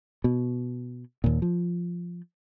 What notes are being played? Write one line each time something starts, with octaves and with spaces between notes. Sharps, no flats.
B2
D#2 A#2
F3